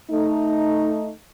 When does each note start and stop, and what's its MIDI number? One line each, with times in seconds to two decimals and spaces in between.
0.11 1.09 57
0.11 1.09 63